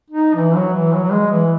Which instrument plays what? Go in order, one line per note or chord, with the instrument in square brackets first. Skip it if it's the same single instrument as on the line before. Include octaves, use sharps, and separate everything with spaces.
[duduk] D#4
E3
F#3
E3
F#3
F#3
G#3
E3